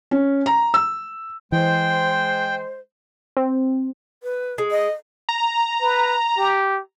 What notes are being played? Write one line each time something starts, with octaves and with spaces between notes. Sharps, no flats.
C#4
A#5
E6
E3 G#3 C5 G5
C4
B4
G#3
D#5
A#5
B4
G4